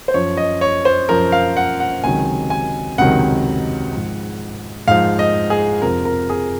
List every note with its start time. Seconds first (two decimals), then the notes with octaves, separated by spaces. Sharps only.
0.08 C5
0.14 F#2 F3 C#5
0.37 D#5
0.61 C#5
0.85 C5
1.09 F#2 F3 A#4
1.32 F5
1.57 F#5
1.80 F#5
2.04 C#2 C3 D#3 F#3 G#5
2.50 G#5
2.98 C#2 C3 D#3 F#3 F#5
3.93 G#2 F3
4.88 G#2 F3 F5
5.19 D#5
5.50 G#4
5.82 F2 C3 F3 A#4
6.05 A#4
6.30 G#4